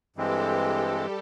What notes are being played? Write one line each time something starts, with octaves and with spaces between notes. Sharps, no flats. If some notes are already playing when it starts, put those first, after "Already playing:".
G2 E3 G#3 C4 G4 A4
G3